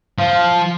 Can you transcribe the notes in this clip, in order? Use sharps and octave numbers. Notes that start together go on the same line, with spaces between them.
F3